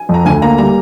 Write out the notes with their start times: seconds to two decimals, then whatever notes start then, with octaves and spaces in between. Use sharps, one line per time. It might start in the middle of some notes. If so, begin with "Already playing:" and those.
Already playing: G#5
0.09 F2
0.14 A#5
0.25 D2 G#5
0.42 A#3 A#5
0.58 G3 A#5